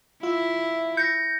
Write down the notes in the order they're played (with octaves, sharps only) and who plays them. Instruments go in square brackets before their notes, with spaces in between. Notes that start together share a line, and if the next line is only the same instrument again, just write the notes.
[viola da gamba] E4 [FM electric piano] F4 E5
[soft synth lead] G6 [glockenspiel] A#6 C#7